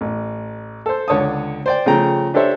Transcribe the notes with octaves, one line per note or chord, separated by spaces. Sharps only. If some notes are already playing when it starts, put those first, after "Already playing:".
A1
A4 C5
C#2 D3 C#5 A5 D#6
C5 D5 G5
C#3 F3 A3 G5 A#5
D4 G4 A4 C5 C#5 E5